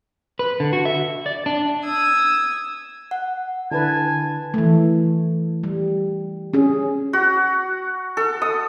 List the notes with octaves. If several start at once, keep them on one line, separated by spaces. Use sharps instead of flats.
B4
D3
F#4
E5
D5
D4
D#6 E6 G#6
F#5
D3 E4 B4 G#5 A5
E3 A3
G3
C#4 G#4
F#4
A4
D#6